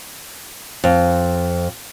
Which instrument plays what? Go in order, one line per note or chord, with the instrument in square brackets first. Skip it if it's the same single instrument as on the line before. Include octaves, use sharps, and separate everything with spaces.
[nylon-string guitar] F2